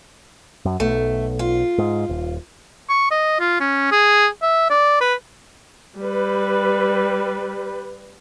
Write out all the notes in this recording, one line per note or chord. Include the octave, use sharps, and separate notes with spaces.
F#2
B1 A3
F4
G#2
D#1
C#6
D#5
F4
C#4
G#4
E5
D5
B4
G3 B4